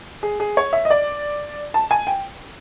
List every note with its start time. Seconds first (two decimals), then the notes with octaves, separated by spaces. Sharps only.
0.23 G#4
0.40 G#4
0.57 C#5
0.73 E5
0.85 D#5
0.90 D5
1.74 A5
1.91 G#5
2.07 G5